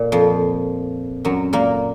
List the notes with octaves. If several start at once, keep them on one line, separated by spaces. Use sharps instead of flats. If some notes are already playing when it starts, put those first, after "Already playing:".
Already playing: A#2
F2 F3
F#2 F#3
A#2 A#3